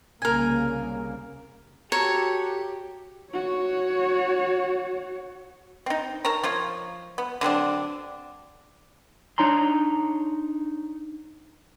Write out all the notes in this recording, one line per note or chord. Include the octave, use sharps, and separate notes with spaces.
C2 C#3 A#3 A#4 G#5
F#4 G4 A4 C#5 A#5
F#4 C#5
C4 D#4
A#4 C#5 A5 A#5
F3 F4 C#5
B3
D3 F#3 C4 D4
D4 D#4 C#5 A#5 C6